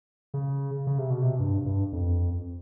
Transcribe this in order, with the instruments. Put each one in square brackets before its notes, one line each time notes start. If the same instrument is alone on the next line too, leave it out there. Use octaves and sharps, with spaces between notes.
[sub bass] C#3
C#3
C3
B2
C3
G2
G2
F2